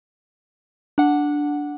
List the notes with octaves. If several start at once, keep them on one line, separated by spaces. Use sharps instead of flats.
D4 F#5